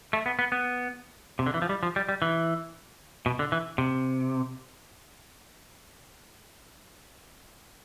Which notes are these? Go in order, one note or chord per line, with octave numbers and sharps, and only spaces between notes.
A3
B3
B3
B3
C3
D3
E3
F3
G3
F3
G3
G3
E3
B2
D3
E3
C3